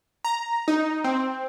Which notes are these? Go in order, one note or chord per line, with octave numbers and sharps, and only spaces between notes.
A#5
D#4
C4